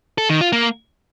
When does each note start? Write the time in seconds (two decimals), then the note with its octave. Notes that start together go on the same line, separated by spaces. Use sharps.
0.18 A4
0.29 D#3
0.41 F4
0.53 A#3